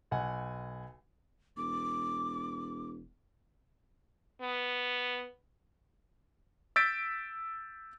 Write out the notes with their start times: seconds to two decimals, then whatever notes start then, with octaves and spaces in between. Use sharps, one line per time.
0.11 B1 F#5 G#5
1.57 E1 D6
4.41 B3
6.76 E6 G6 A6 B6 D7